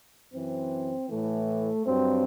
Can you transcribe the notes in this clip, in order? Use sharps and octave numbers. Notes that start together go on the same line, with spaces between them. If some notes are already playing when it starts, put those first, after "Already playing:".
F#2 E3 C4
A2 E3 A3
G2 F#3 C4